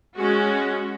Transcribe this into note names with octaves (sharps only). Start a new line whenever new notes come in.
G#3 C#4 F#4